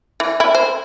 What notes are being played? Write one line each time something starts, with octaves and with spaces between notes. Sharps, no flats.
E3
E4
C5